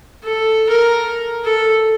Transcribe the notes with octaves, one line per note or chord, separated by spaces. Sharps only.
A4
A#4
A4